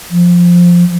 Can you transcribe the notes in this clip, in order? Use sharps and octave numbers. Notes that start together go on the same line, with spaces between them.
F3